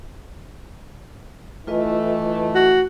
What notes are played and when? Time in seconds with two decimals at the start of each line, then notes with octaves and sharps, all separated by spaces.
1.67 E3 A3 F4 B4 D#5
2.55 F#4